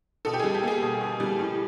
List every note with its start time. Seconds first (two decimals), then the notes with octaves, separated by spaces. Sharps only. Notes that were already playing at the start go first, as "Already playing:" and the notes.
0.25 B2 A4
0.34 G4
0.39 G3 G#4
0.54 G4
0.63 A#3 G#4
0.82 B2
1.01 B2
1.20 G3
1.39 A2